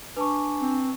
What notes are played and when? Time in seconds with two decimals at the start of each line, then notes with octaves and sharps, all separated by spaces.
0.16 D4 B4 G#5 A5 C#6
0.61 C4